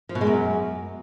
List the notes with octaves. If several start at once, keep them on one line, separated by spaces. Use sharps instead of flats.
F3
B2
G#3
F#2